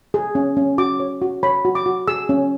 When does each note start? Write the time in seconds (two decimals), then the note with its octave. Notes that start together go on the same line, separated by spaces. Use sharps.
0.14 G#4
0.35 C#4
0.57 C#4
0.78 F#4 D6
1.00 C#5
1.22 F#4
1.43 C#5 B5
1.65 F#4
1.75 D6
1.86 F#4
2.08 G#4 E6
2.29 C#4